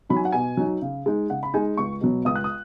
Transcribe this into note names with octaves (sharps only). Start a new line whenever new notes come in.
F#3 D#4 B5
G#5
F#5
B2 G#5
F#3 D#4
C#3
G#3 D#4
C#3 F#5
B5
G#3 D#4 G#5
C#2 C#6
B2 F#3 B3
C#2 D#6
F#6
D#6